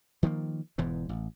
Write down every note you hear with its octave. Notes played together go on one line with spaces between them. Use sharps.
D#3 F3 G#3 A#3
E1 E2 G#2 E3
A1